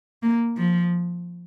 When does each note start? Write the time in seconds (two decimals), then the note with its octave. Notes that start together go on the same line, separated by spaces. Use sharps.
0.23 A#3
0.58 F3